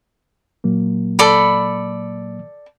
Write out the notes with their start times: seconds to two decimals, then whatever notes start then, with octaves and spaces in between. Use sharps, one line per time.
0.64 A#2 F#3 A#3
1.19 A4 D5 B5